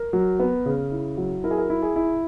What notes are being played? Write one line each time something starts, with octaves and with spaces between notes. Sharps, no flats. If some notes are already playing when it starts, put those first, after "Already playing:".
Already playing: A#4
F#3
B3
C#3
E4
F#3
E4 A#4
G#4
A#4
E4
G#4
E4